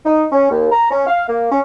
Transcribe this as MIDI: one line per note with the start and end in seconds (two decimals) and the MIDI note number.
0.05 0.25 63
0.32 0.50 61
0.50 0.67 39
0.72 0.89 82
0.90 1.04 61
1.07 1.24 77
1.29 1.51 58
1.51 1.60 61